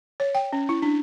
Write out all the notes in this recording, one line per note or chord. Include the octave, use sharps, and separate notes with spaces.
C#5
G5
C#4
E4
D4